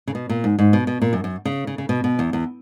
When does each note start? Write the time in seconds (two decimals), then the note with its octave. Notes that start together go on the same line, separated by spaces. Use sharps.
0.07 C#3
0.15 B2
0.29 A#2
0.44 G#2
0.59 G#2
0.73 B2
0.87 B2
1.02 A#2
1.13 F#2
1.24 F#2
1.45 C#3
1.67 C#3
1.78 C#3
1.89 B2
2.04 B2
2.19 E2
2.33 E2